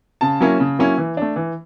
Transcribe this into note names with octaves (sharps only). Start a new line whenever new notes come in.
C#3 A5
F#3 A#3 C#4 E4
C#3
F#3 A#3 C#4 E4
E3
A3 D4
E3